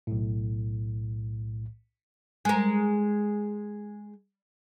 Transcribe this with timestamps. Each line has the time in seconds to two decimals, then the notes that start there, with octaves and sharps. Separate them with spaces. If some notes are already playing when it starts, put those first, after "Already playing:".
0.07 B1 A2
2.45 G#3 A#4